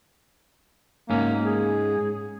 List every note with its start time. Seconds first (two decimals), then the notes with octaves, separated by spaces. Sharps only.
1.10 G#2 A#3 C#4
1.45 G#4